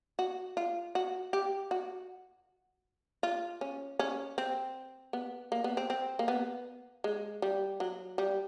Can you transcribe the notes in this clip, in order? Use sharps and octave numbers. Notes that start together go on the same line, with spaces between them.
F#4
F4
F#4
G4
F#4
F4
C#4
C#4
C4
B3
A#3
B3
C4
C4
A#3
B3
G#3
G3
F#3
G3